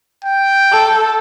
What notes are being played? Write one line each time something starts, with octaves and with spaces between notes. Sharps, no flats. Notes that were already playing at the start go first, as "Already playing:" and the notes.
G5
A4